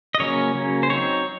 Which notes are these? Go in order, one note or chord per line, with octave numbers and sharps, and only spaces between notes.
D#5
C#3 F#3 A#3 C#4 C#5
C#3 F#3 A#3 C#4
C5
F#3 C4 D#4 C#5